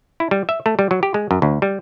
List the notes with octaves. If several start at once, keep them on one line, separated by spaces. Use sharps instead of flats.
E4
G3
E5
A3
G3
F#3
G4
G#3
F#2
D2
G3